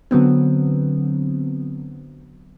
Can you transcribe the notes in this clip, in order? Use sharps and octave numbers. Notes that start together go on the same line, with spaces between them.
D3 F#3 B3 C4